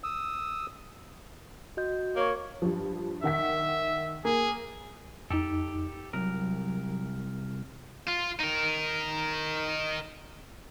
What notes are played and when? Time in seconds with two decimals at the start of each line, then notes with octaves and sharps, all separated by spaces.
0.04 D#6 E6
1.77 F#4 D#5 G6
2.16 A#3 C#5
2.62 G2 F3
3.24 D#3 E5 F#5 B6
4.25 A#3 G#4
5.31 F2 D#4 G4 A4
6.13 C2 F#3 A#4
8.08 F4
8.40 D#4 A#4